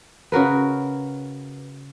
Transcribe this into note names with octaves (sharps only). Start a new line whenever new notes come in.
C#3 F#4 A#4 B4